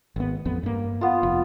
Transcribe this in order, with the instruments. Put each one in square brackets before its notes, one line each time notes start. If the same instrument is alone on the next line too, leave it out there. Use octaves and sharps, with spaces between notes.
[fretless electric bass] G#1 B3
A1 F2 B3
G2 A#3
[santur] B3 F4
[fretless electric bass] F1 [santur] F4